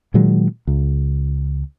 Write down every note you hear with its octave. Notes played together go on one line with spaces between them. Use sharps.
A#2 D#3 F#3 G#3
C#2